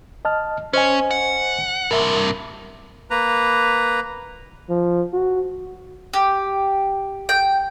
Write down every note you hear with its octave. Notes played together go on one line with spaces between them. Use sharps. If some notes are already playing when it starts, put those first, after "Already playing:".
D#5 A5 F6
C#4 C5 D#5 G#5
F#5
G2 C3 A#4 E5
A#3 B4 A#5
F3
F#4
G4
G5